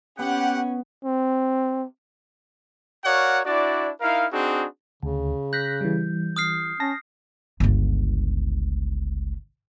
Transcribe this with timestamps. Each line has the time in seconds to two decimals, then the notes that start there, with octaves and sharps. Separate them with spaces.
0.19 B3 C#4 G4 F#5
1.04 C4
3.05 F#4 A#4 C#5 D5 F5 F#5
3.45 D4 E4 F#4 D5
4.01 D#4 E4 A#4 F5
4.32 C4 D4 D#4 F#4 G#4
5.03 D2 C#3
5.53 F#6 G6 A#6 B6
5.81 E3 G3
6.36 D#6 F6 C7
6.80 C#4 A5 A#6
7.60 G1 C#2